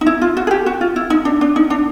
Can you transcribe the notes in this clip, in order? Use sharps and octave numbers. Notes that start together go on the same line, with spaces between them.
D#4
E4
F4
F#4
G#4
G4
F#4
F4
E4
D#4
D4
D4
D#4
D4